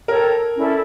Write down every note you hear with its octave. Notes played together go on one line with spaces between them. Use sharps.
A4 A#4 C#5 G5 A#5
C#4 E4 A4 D5